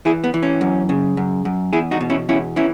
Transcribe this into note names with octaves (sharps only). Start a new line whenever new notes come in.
E3 E4 G#4
B3
E3
C#4
F#2
C#3
F#2
F#2
E2 E4 G#4
D#4 F#4
B2
C#4 E4
E2 C#4 E4
E3 C#4 E4